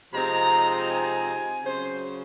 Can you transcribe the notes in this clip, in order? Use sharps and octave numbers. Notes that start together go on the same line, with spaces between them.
C3 F3 G#3 C4 D#4 A#5
G#5
C#3 F#3 C#4 C5